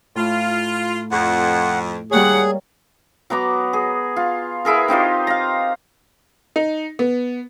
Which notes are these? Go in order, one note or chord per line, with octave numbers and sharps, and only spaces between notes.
A2 F4
F2 F#5
D#2 G3 A#3 G#4 C#5 F#5
F#3 B3 A#5 D6
G#4
F4
B3 E4 G#4 A#4
C4 D#4 F4 G4
F5 A#5
D#4
B3